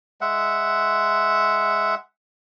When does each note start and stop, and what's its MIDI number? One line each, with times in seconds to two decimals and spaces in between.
0.21 1.95 56
0.21 1.95 76
0.21 1.95 78